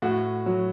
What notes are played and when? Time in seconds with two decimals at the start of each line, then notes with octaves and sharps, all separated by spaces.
0.02 A2 F#4
0.46 F#3